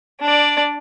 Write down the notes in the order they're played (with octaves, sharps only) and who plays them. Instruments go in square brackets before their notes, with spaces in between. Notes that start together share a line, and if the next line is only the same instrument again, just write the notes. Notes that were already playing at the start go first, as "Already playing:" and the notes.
[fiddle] D4 D5